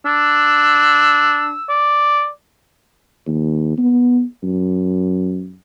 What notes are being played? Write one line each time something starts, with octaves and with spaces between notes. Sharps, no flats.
D4 E6
D5
D#2
B3
F#2